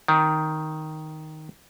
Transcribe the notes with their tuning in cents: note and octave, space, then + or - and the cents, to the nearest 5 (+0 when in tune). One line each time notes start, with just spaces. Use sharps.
D#3 +0 C4 +10